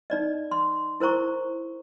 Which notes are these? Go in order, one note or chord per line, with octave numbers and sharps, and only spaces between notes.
D#4 D5 D#5
C6
E4 A#4 C5 A#5 C#6